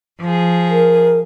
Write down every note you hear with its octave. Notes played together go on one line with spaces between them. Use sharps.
F3 G#4
A#4